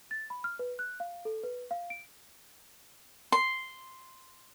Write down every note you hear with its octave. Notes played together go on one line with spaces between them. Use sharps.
A6
B5
F6
B4
F#6
F5
A4
B4
F5
D7
C6